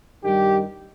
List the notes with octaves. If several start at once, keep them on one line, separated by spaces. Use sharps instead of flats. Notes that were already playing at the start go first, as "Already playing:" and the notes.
G2 D#3 G3 G4